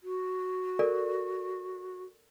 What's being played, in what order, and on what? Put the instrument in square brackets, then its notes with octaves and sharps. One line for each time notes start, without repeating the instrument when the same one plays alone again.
[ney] F#4
[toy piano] A4 A#4 D5